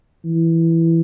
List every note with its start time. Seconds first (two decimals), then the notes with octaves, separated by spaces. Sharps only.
0.25 E3